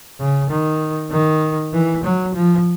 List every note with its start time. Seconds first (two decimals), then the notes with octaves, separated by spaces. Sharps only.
0.20 C#3
0.51 D#3
1.11 D#3
1.73 E3
2.04 F#3
2.35 F3